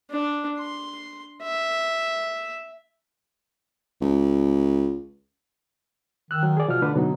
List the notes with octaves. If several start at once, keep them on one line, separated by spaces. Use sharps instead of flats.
D4
C6
E5
C#2
D#3 E6 F#6
F#3
G#4 D5
B2 F3 F6
D3 A3 D4 B4
B2 D3 F#3 D#4